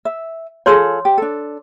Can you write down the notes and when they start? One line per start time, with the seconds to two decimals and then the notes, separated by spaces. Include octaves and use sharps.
0.05 E5
0.66 F4 G#4 A4 C#5 C6 E6
1.05 G4
1.18 D4 A4